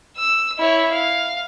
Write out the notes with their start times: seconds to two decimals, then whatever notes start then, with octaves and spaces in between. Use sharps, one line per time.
0.17 E6
0.59 E4 C#5
0.91 F5